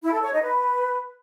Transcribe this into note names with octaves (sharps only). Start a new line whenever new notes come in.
E4
A4
C#5
D#4
B4